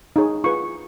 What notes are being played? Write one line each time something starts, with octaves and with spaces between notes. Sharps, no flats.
D#4 G#4 C#5
F4 G#4 B4 C#6